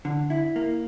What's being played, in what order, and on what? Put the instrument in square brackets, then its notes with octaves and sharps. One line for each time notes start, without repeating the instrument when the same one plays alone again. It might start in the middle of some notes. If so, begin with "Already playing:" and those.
[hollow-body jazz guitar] D3
E4
A#3